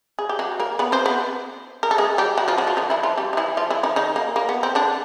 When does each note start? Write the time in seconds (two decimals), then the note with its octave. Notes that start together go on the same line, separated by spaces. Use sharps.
0.19 G#4
0.29 G4
0.39 F#3 F#4
0.60 A#3 A#4
0.79 B3 B4
0.92 C4 C5
1.06 B3 B4
1.83 A#4
1.91 A4
1.98 G#3 G#4
2.18 G3 G4
2.38 F#3 F#4
2.48 F3 F4
2.58 F#3 F#4
2.67 F3 F4
2.77 D#3 D#4
2.90 E3 E4
3.03 F3 F4
3.18 G3 G4
3.33 D#4
3.37 E3 E4
3.57 F3 F4
3.71 E3 E4
3.83 D#3 D#4
3.96 D#3 D#4
4.16 A#3
4.36 A#3
4.49 B3
4.63 C4
4.75 D3 D4